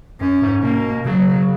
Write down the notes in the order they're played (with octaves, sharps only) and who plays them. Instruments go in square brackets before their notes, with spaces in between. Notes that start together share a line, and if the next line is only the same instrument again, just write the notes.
[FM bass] F#2 [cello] C#4
[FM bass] G#2
[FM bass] B2 [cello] A#3
[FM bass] C#3 [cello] F#3